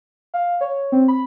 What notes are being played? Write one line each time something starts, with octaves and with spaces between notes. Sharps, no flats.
F5
C#5
C4
B5